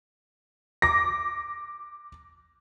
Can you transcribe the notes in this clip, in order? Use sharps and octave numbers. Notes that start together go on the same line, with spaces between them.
D6 A#6